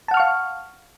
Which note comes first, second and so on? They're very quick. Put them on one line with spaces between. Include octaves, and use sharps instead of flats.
A5 F#5 F6 C#6 F5